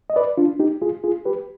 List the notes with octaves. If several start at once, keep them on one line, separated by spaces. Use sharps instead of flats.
D#5
B4 D5
D4 F4
D#4 G4
F4 G#4
F4 G#4
G4 B4